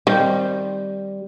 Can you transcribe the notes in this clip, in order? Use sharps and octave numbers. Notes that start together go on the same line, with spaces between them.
D#3 G3 C4